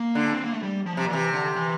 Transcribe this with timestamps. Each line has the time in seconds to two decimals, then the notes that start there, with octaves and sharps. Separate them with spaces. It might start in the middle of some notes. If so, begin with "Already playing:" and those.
Already playing: A#3
0.15 D3
0.26 D4
0.34 C4
0.44 A#3
0.54 A3
0.63 G3
0.86 F3
0.97 C3
1.05 A#2
1.10 C3 E3
1.33 D3
1.56 E3